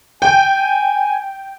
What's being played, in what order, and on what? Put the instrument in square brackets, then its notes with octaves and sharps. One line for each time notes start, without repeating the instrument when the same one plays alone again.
[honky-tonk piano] G5 [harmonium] G#5